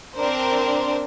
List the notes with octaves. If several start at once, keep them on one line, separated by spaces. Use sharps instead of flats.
C4 D4 A#4 C5